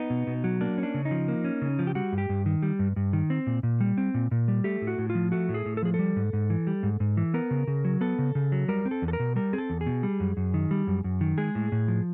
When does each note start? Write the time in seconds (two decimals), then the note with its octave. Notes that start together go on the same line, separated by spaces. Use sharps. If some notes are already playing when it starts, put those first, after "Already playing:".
Already playing: B3 D#4
0.10 B2
0.27 B2
0.44 F#3
0.61 A#3 D4
0.78 C#4
0.83 D4
0.94 C#3
1.05 D#4
1.11 F3
1.28 A#3
1.45 C#4
1.62 C#3
1.79 F3
1.87 G4
1.95 G3 F#4
2.13 G2
2.18 G4
2.29 G2
2.46 D#3
2.63 G3
2.79 G2
2.96 G2
3.13 D#3
3.30 C4
3.47 A#2
3.63 A#2
3.81 G3
3.98 C4
4.14 A#2
4.31 A#2
4.48 G3
4.64 A3 G4
4.82 A2
4.87 F#4
4.98 A2
5.10 F4
5.15 F3
5.32 A3 F#4
5.49 A2
5.54 G#4
5.66 A2
5.77 A4
5.82 F3 G#4
5.94 A4
5.99 G3
6.16 G#2
6.33 G#2
6.50 E3
6.67 G3
6.83 G#2
7.00 G#2
7.17 E3
7.34 B3 A#4
7.51 C#3
7.67 C#3
7.85 F#3
8.01 B3 A4
8.19 C#3
8.35 C#3
8.52 F#3
8.68 G3 A#4
8.85 C4
8.91 A4
9.02 E2
9.08 A4
9.13 A#4
9.20 B2
9.36 G3 A#4
9.53 C4 G#4
9.58 A4
9.70 E2
9.81 G#4
9.86 B2
10.03 G3
10.20 F#2
10.37 F#2
10.54 D#3
10.71 G3
10.87 F#2
11.04 F#2
11.21 D#3
11.38 G#3 G#4
11.55 A2
11.72 A2
11.88 F3